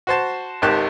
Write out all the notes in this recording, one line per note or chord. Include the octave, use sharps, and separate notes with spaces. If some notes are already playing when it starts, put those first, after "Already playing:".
F#4 C5 A5
G#1 C#2 D#3 G4 A5 F#6